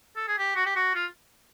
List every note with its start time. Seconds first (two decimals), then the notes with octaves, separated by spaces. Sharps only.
0.16 A4
0.27 G#4
0.38 G4
0.55 F#4
0.66 G4
0.75 F#4
0.95 F4